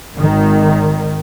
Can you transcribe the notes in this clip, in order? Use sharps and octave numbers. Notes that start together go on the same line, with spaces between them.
G#1 D#3